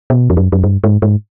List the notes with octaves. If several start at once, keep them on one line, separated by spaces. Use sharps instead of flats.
B2
F2
F#2
F#2
G2
G#2
G#2